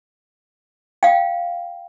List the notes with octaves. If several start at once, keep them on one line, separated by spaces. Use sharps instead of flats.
F5 G5